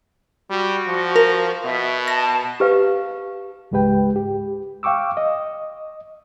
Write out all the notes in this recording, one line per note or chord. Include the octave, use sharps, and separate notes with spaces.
G3 F#4
F3
A#4
B2 E5
A5 A#6
G4 B4 F5
C#2 G#2 G#3 G4 B4 G5
G4
F5 G5 C#6 D6 E6
D#5